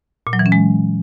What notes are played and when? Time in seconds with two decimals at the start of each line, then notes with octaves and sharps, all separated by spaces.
0.27 A#2
0.33 F#3
0.39 E3
0.46 C#4
0.52 G#3